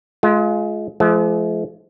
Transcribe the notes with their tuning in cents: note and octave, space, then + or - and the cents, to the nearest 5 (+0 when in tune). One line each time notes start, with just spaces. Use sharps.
G#3 +30 F4 +0
F3 -25 G#3 +45